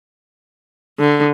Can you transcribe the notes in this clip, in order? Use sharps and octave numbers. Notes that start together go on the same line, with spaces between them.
D3